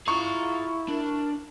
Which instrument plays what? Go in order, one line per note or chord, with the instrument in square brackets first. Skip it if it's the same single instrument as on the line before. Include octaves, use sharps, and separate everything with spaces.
[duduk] E4 [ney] F4 [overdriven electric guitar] G#4 A#5 [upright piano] C#6
[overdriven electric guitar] D4 [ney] A#4